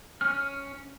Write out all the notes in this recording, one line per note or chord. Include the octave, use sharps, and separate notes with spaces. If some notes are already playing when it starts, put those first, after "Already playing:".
C#4 F6